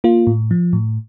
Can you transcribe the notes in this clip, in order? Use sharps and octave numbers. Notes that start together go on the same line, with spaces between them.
A#3 F4
A2
F3
A2